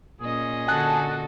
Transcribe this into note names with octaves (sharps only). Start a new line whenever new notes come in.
A#2 C#4 G#4 D#5
D3 F#4 A4 G#5 A5 F#6